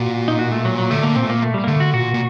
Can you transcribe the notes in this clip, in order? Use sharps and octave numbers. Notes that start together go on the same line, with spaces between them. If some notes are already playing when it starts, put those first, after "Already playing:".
Already playing: A#2 F#4
D#4
F#4
A3
F#3
F#3
D3 A3
A#3
A#2 C4
A3
A#3
A3
G3
A#3
D3 A3
F#4
A#2 F#4
A#2